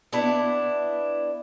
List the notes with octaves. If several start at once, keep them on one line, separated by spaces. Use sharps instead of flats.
B3 D4 E4